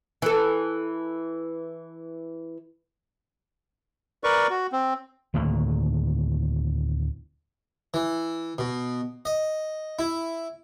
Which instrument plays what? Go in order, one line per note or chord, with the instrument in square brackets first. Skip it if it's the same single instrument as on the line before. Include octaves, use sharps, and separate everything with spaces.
[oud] E3 A4
[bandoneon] A#4 B4 D5 C#6
F#4
C4
[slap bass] D2 A2 D#3 A#3
[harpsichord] E3
B2
D#5
E4